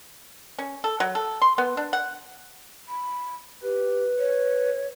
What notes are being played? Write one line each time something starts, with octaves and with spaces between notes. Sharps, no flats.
C#4
A4
F#3
A4
C6
B3
D4
F#5
B5
G4 B4
C#5